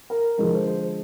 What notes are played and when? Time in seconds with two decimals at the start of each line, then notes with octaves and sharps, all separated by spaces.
0.10 A#4
0.38 D3 F3 G#3 A#4
0.53 C5
0.67 C5